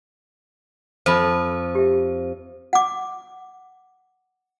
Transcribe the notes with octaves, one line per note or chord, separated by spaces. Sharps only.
F2 C5 E5 B5
G4 E5
F#5 D6